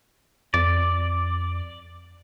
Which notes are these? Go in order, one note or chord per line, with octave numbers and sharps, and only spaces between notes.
F2 D5